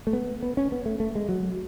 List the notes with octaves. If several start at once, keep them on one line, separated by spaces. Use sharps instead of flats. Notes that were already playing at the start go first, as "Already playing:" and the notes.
A3
B3
B3
C#4
B3
A3
A3
G#3
F#3